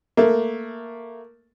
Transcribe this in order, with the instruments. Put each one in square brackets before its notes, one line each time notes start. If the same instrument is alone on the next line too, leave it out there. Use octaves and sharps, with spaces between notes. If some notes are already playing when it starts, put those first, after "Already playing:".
[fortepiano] A3 A#3